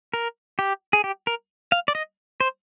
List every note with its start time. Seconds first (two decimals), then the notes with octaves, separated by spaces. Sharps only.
0.14 A#4
0.59 G4
0.93 G#4
1.04 G4
1.27 A#4
1.72 F5
1.88 D5
1.95 D#5
2.40 C5